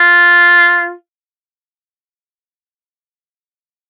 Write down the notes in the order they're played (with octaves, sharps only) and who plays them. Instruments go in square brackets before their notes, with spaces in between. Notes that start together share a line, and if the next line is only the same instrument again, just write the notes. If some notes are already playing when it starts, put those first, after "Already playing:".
Already playing: [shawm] F4